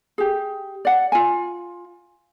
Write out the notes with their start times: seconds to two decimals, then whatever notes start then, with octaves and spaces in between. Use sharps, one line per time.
0.18 G4 G#4
0.85 D5 F#5
1.12 F4 G#5